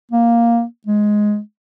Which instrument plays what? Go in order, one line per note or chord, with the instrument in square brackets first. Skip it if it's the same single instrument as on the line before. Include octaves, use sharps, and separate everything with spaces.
[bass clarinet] A#3
G#3